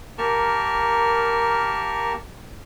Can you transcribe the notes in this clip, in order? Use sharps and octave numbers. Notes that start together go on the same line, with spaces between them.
A#3 G4 A#4 A5 C#6 F6